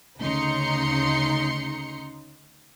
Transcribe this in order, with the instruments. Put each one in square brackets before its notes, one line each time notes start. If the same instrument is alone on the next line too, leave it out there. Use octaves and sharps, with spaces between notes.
[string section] D2 C#3 D#4 A#5 C6 C#7